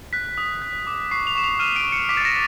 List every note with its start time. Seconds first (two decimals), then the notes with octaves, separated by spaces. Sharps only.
0.13 F#6 B6
0.38 D#6
0.62 F#6
0.87 D6
1.11 C#6 C7
1.27 F7
1.35 C#6 E7
1.44 F7
1.59 F6 D#7
1.76 D7
1.84 C#6
1.92 C#7
2.09 D6 B6
2.17 A6
2.25 A#6